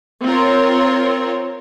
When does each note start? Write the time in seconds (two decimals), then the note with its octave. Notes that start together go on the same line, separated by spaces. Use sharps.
0.23 C4 F4 A#4 C#5